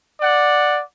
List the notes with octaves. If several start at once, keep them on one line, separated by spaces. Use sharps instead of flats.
D5 F#5